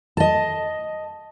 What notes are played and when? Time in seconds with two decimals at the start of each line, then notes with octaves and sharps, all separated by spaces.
0.17 D#5 A5